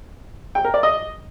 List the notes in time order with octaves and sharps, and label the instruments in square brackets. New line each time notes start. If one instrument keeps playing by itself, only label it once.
[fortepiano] G5
A#4
D5
D#5